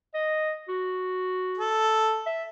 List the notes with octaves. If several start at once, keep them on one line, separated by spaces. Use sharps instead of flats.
D#5
F#4
A4
E5